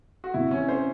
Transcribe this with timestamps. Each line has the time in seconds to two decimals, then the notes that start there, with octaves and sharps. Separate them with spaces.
0.24 F#4
0.34 C3 E4
0.51 E3 C#4
0.68 C#4 C5